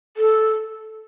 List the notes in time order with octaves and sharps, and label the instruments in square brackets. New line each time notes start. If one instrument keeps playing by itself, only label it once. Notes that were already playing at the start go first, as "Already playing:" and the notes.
[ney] A4